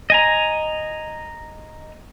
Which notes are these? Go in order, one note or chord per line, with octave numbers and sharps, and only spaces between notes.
D#5 G#5 A#5